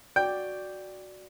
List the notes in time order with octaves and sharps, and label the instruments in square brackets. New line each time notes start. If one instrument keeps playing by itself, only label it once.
[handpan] F#4 D5 [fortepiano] G5